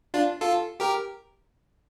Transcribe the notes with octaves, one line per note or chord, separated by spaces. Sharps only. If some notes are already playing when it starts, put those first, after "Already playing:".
D4 F4
F4 A4
G4 A#4